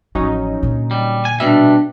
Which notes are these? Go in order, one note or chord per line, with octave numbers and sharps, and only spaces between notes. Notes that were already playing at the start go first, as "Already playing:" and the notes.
A1 F3 F#3 C#4 D#4
A#2 D3
G3
G#5
B2 G3 D4 E5